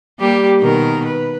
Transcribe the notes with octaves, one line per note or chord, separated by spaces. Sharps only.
G3 A#3 G4
B2 D#3 A#4
B4